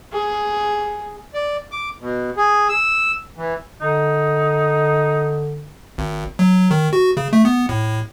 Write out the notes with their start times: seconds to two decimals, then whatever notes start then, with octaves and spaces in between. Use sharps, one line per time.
0.12 G#4
1.34 D5
1.72 D6
2.01 B2
2.37 G#4
2.69 E6
3.37 E3
3.81 D3 D#4
5.98 G#1
6.39 F#3
6.71 D#3
6.93 F#4
7.17 C#3
7.33 A3
7.45 B3
7.69 A2